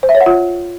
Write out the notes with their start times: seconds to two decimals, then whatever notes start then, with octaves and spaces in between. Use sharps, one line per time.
0.03 C5
0.09 E5
0.15 C#5
0.21 F#5
0.26 F4